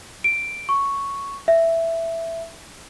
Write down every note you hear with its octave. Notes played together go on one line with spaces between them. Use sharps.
D7
C#6
E5